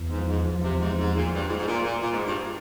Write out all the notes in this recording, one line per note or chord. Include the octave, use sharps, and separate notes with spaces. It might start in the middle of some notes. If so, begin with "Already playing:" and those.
Already playing: E2
G#2
F3
G#2
F3
C3
E2
G#2
G#2 F3
A#2
F4
G2
G#2 F4
G#2
A#2
F4
A#2
A#2 F4
G#2
G2 F4